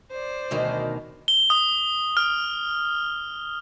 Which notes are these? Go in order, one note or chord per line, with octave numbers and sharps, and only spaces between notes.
C5 D5
D2 B2 D#3
G7
D#6
F6